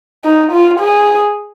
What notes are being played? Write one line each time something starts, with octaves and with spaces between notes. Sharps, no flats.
D#4
F4
G#4